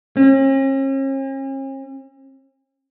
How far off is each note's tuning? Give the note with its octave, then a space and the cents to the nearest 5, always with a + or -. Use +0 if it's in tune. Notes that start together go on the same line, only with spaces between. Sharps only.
C#4 -45